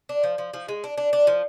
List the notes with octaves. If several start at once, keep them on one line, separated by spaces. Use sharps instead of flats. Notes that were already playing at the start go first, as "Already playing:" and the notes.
D4
F3
F3
F3
G#3
D4
D4
D4
F3